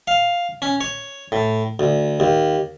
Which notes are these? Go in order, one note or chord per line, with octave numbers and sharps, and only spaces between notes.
F5
C#4
C#5
A2
D2
D#2